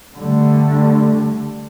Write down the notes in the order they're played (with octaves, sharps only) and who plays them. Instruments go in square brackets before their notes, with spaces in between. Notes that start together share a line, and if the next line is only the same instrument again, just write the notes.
[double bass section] D3 G3 A3